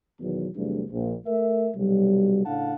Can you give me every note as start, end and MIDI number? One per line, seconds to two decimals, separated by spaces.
0.20 0.47 40
0.20 0.47 47
0.20 0.47 51
0.20 0.47 54
0.20 0.47 59
0.55 0.83 40
0.55 0.83 48
0.55 0.83 54
0.55 0.83 55
0.55 0.83 57
0.55 0.83 62
0.91 1.13 34
1.26 1.69 57
1.26 1.69 70
1.26 1.69 76
1.74 2.45 35
1.74 2.45 48
1.74 2.45 54
1.74 2.45 55
2.45 2.74 45
2.45 2.74 49
2.45 2.74 62
2.45 2.74 77
2.45 2.74 78
2.45 2.74 81